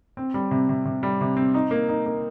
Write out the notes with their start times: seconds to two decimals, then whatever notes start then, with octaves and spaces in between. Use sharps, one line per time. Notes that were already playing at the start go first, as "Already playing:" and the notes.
0.17 C4
0.34 G3
0.51 C3
0.69 C3
0.85 C3
1.03 G3
1.21 C3
1.37 C4
1.54 D#4
1.71 A#3
1.89 D#4
2.06 A#3